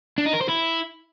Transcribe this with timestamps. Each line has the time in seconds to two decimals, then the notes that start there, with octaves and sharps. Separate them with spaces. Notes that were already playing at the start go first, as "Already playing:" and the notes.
0.18 D4
0.26 D#4
0.34 A#4
0.41 C5
0.49 E4